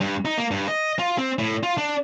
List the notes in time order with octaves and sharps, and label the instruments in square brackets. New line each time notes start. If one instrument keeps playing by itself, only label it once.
[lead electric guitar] G2
D#4
A#3
G2
D#5
F4
C4
A2
F4
D4